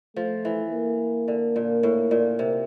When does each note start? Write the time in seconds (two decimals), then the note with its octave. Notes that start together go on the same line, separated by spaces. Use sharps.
0.16 F3 A3
0.45 E3
0.72 A#3
1.28 D3
1.56 A#2
1.83 A2
2.11 A#2
2.39 C3